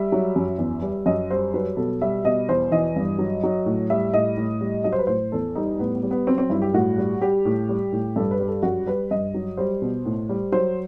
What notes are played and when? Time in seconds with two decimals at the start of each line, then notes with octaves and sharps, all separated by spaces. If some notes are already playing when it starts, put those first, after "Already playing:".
Already playing: G3 E5
0.12 F#3
0.36 F#2
0.58 E2
0.82 G3
1.06 F#2 D#5
1.30 G3 C5
1.54 F#3 B4
1.77 B2 A4
2.01 G3 E5
2.25 B2 D#5
2.49 E2 C5
2.71 E3 D#5
2.96 G2
3.19 F#3
3.43 F#3
3.66 A2
3.90 G3 E5
4.13 A2 D#5
4.37 A2
4.61 G3
4.84 F#3 D#5
4.92 C5
4.99 B4
5.07 A2 C5
5.32 E2 A4
5.55 G3 D#4
5.79 A2 B3
5.95 B3
6.03 G3
6.11 B3
6.27 F#3 C4
6.38 C4
6.50 G2 E4
6.62 G4
6.73 A2 F#4
6.98 G3
7.21 G3 G4
7.45 A2
7.69 G3
7.93 A2
8.16 G2 A4
8.31 B4
8.39 G3
8.48 A4
8.63 F#2 F#4
8.87 G3 B4
9.11 G2 D#5
9.34 F#3
9.57 G3 C5
9.82 B2
10.06 A2
10.29 G3
10.52 F#3 C5